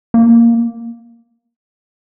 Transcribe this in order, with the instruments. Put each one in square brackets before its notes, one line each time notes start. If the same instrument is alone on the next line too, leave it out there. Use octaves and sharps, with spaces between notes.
[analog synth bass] A#3